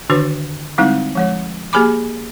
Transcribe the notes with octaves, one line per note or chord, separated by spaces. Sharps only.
D3 D#3 D4 F#4 B4
D3 G3 G#3 C4 D#4 E4
F3 G#3 C#5
A#3 G4 G#4 G#5 B5 D6